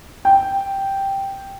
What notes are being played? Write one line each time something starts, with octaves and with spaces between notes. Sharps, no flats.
G5